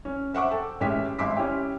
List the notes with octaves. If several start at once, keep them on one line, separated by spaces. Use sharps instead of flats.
C#4
C5 E5 F#5 C#6 D6
A4 G5
A1 G#3 C#4 G4 E5 B6
G#1 E5 C6 D6 E6 B6
C#4 E4 G4